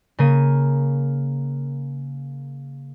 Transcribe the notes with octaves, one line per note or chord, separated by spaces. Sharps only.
C#3 A#3 D#7